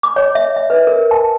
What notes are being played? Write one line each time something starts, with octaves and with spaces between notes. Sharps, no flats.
D6
C#5
E5
E5
B4
A#4
A5